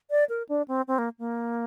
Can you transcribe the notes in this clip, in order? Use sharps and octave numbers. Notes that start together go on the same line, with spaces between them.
D5
A#4
D4
C4
C4
A#3
A#3